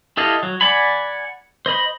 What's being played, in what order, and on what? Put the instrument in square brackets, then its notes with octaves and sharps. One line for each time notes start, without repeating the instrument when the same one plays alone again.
[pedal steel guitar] E4 G4 A4 D#5 F5
F#3
D5 F#5 G#5 B5
C5 D#5 B5